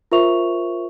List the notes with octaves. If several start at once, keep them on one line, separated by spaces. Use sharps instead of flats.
F4 A#4 C5 E5 C#6 F7